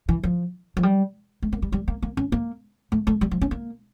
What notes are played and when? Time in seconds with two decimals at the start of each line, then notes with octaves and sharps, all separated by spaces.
0.09 E3
0.23 F3
0.77 F3
0.83 G3
1.42 A3
1.52 A#3
1.62 G3
1.72 G3
1.88 A#3
2.02 A#3
2.17 C#4
2.32 A#3
2.92 A3
3.07 A3
3.21 G3
3.31 F3
3.41 C#4
3.51 A#3